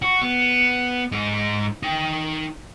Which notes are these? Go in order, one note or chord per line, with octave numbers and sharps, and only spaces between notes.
F#4
B3
G#2 D#4
D#4 G5